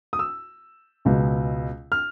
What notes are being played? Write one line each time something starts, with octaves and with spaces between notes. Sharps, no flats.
D#6
E6
C#2 B2 G#3 B3
F6